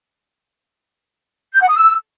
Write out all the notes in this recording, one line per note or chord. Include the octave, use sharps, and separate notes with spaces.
G6
F#5
D#6
E6